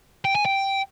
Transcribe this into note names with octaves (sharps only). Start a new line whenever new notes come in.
G5
G#5
G5